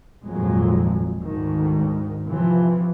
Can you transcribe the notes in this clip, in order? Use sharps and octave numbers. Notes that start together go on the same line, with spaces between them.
G#1 F2 A#2 F#3 G#3
D2 G#2 D#3
C3 E3 F3